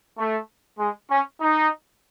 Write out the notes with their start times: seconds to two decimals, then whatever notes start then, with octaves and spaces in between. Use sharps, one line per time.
0.18 A3
0.79 G#3
1.10 C#4
1.40 D#4